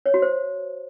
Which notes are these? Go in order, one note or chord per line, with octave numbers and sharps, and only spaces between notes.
C#5
F#4
C5